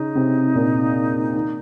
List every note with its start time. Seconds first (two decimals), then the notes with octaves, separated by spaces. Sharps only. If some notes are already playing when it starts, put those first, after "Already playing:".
Already playing: C#3 C#4 D#4
0.15 C3 C4
0.55 A#2 A#3
1.34 D#3